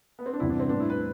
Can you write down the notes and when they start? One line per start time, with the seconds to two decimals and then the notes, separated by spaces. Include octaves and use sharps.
0.19 B3
0.26 C4
0.33 D4
0.40 E2 C3 G3 E4
0.50 D4
0.60 C4
0.69 A2 G3 B3 D4
0.80 E4
0.90 B4